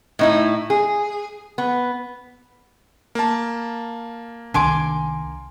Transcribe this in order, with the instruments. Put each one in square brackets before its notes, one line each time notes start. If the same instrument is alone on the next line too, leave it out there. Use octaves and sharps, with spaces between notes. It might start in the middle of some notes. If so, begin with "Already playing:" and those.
[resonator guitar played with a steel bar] A2 D#4 E4
G#4
B3
[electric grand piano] A#3 A5
[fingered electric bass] C2 D#3 D4 [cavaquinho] G#5 C6 D6